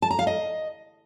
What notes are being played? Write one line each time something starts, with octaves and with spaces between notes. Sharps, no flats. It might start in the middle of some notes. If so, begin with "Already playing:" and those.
A5
A#5
F5
D#5